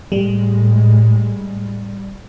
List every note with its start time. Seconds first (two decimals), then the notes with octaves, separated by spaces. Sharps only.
0.12 A2 G3 G#3